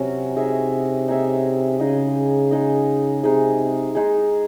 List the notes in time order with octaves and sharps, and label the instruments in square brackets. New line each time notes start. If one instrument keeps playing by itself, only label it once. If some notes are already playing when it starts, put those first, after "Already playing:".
Already playing: [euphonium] C3 [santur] F#3 C#4 F#4
[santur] D#4 G#4 C#5 E5
D#4 G#4 C#5 E5
[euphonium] C#3 [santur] G#3 D#4 G#4 D#5
[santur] G#3 D#4 G#4 D#5
[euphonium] C3 [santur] G#3 D#4 G#4
[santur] G#3 D#4 G#4